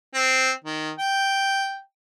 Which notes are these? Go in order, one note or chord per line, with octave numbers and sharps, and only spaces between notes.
C4
D#3
G5